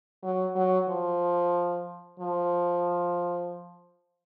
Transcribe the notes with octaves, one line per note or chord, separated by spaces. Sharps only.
F#3
F#3
F3
F3